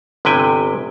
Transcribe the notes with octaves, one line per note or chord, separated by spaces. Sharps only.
G1 C3 B4 G5 G#5